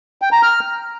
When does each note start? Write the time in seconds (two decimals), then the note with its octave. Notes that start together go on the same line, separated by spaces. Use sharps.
0.22 G5
0.32 A#5
0.43 F6